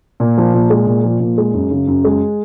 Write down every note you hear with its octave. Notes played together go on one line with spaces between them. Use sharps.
A#2
F3
A#2
G#3
A#2
F3
A#2
G#3
F#2
C#3
F#2
G#3